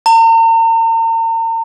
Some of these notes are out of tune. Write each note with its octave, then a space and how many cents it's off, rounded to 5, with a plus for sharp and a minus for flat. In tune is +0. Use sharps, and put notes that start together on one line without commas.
A#5 -45